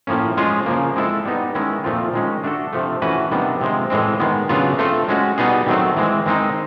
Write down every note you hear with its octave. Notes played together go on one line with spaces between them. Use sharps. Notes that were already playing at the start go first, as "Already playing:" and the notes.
A2 F3 A#3 C#4
F3 G#3 C#4 F4 G#4
C#3 F3 A#3
G#3 C4 E4 A4
G3 B3 D#4
D#3 G#3 C#4 E4
A#2 F3 A3 C4 F4
D#3 G#3 C#4
A3 D4 F#4 A4
C3 F3 A3
E3 A3 C#4 F#4 B4
C3 D#3 G3 B3 D4
C3 F3 G#3
A2 E3 G#3 C4
D#3 G#3 B3
C#3 F#3 B3 D4 F4
A3 C4 F4 A4
G#3 C#4 F#4
B2 G3 B3 D#4 G#4
D#3 F#3 A3 C4
E3 G#3 C4
D#3 G#3 C4 D#4